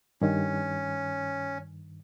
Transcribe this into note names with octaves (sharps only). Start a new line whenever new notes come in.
G2 D#3 C#4